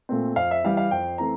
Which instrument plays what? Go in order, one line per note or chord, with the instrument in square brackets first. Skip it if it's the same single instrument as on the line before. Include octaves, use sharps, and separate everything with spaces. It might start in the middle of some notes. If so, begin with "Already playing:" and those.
[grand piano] A#2 A3 C4
F2 F5
E5
E3 G3 F5
F5
F2 G5
E3 A3 C4 A#5